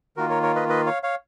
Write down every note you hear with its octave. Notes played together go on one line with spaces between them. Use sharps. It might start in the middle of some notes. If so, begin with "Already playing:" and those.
D#3 A#3 F4 F#4 A#4
A#4 C#5
A#4 C#5
B4 D#5
B4 D#5
C#5 F5
C#5 F5